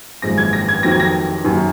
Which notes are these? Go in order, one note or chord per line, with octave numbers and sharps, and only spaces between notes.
G#1 F#2 F3 G#3 A#6
G#6
A#6
G#6
F2 D#3 F#3 A#6
G#6
A#6
F#1 F#2 D#3 F#3